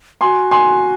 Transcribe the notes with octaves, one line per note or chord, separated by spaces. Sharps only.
F#4 G#5 C6
G#5 C6